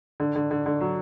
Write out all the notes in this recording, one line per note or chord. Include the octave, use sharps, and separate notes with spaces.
D3
D3
D3
D3
F#3